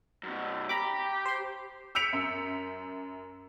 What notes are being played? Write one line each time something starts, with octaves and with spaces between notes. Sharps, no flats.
F#2 B2
G4 A#5 B5 D6
C5 C6
E6 G6 B6 C#7 D7 F7
F#2